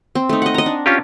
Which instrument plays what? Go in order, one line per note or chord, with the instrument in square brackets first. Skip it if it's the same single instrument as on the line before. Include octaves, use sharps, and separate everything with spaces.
[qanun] C4
A3 D#4
D#5 F#5
D#5 A#5
D4
[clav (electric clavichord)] C#4 F4 G4